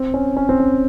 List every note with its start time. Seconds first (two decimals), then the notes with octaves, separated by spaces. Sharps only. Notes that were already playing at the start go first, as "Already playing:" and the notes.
Already playing: C4
0.14 C#4
0.37 C#4
0.49 C4
0.60 C#4